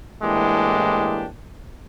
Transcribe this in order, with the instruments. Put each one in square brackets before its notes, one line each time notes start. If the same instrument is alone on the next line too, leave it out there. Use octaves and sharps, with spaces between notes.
[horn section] A2 E3 G#3 A#3 D4 G4